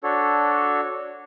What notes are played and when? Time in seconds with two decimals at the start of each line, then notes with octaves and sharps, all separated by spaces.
0.03 D4 F#4 A4 C#5